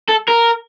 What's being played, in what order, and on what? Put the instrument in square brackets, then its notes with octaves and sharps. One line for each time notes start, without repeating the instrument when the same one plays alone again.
[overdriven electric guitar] A4
A#4